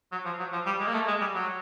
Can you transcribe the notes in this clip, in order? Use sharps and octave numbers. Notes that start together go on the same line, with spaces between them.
F#3
F3
F#3
F3
G3
G#3
A#3
A3
G#3
G3
F#3